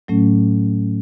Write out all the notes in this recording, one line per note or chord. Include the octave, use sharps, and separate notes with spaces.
A2 F#3 A3 C#4